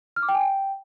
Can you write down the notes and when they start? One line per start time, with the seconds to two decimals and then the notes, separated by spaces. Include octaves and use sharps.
0.16 F6
0.22 D6
0.29 G5
0.35 G#5
0.41 G5